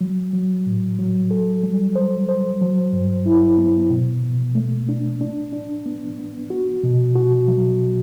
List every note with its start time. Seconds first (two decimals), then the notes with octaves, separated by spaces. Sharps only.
0.01 F#3
0.33 F#3
0.66 A2
0.99 F#3
1.31 A4
1.63 G3
1.95 C5
2.29 C5
2.61 F#3
2.93 G2
3.26 E4
3.58 B3
3.90 B2
4.23 B2
4.55 A3
4.89 D4
5.21 D4
5.53 D4
5.86 B3
6.19 B3
6.50 F#4
6.83 B2
7.15 F#4
7.48 F#3